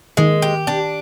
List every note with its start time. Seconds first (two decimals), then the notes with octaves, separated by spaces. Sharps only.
0.17 D#3 G#3
0.42 G4
0.67 D4